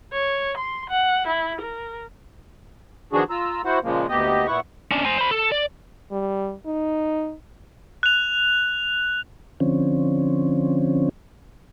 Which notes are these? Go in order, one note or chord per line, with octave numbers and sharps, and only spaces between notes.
C#5
C6
F#5
E4
A#4
D#3 F3 B3 D4 F#4 G#4
F4 A#5 E6
E4 F#4 C5 F#5
A#2 C#3 F3 G#3 A#3
D2 A#3 B3 G4 D#5
A#2 B3 E4 F#5 C#6
C#4 D4
C5 G#5
C5 B5
A4
D5
G3
D#4
F#6 F7
D3 F3 C4 C#4